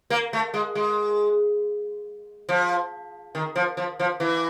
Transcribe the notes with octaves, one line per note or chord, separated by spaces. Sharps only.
A#3
A3
G#3
G#3
F3
D#3
F3
F3
F3
E3